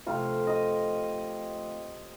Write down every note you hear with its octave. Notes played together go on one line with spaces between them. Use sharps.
C3 F3 A3 F5
D#5